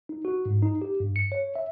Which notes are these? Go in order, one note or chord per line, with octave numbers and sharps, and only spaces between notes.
D#4
F#4
G#2
D#4
G4
G2
C#7
C#5
E5